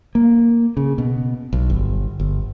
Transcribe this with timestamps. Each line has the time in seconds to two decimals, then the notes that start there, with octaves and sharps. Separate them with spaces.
0.15 A#3
0.77 C#3
0.98 B2
1.53 B1
1.70 G1
2.20 G1